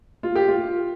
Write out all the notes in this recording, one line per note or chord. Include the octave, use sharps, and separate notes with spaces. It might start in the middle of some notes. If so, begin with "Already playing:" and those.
F4
G4
F4